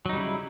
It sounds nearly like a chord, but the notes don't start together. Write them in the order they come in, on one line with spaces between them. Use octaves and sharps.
F#3 D#4 G3 C#3 E4